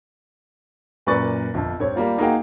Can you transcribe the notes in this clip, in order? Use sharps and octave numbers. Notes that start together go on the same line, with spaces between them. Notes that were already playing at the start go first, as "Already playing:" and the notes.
F#2 A#2 B4 D5 C#6 A6
G1 F2
G2 C4 C#5
G3 A#3 F4
A#3 D#4 F#4 G#4 F5 G5